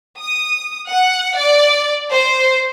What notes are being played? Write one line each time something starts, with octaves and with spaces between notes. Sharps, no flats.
D#6
F#5
D5
C5